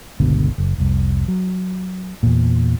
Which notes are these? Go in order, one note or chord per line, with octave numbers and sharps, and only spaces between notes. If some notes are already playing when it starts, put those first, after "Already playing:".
G1 C#2 B2 D3
F#1
F1 C2
F#3
E2 A#2